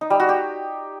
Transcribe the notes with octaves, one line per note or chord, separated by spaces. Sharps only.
D#4
G3
F#4
G4